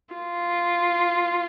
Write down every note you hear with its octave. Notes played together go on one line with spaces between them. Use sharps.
F4